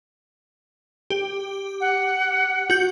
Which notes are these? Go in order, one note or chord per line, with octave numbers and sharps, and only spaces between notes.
G4
F#5
F#4 G6